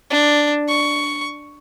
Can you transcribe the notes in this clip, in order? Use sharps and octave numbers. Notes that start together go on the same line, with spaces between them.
D4
C#6